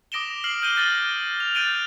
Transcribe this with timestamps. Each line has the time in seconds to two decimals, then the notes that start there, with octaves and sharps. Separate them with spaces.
0.12 D6 D#6 A#6 D7 E7 G7
0.44 F6 C7 F#7
0.62 F6 G6 D#7 F#7 G7
0.76 F6 G6 A6 A#6 D#7 G7
1.40 F7
1.55 F#6 G6 A6 D7 D#7 G7